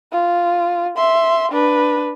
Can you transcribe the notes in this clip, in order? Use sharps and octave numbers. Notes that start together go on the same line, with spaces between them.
F4
E5 C6
D4 B4